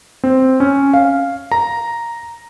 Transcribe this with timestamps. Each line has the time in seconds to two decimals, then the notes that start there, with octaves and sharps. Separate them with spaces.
0.24 C4
0.60 C#4
0.94 F5
1.52 A#5